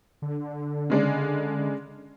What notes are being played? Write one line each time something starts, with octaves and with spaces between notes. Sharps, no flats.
D3
C#3 G#3 D4